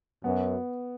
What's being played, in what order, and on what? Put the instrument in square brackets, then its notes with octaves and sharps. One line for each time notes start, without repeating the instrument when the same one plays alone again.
[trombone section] F#2 [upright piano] B3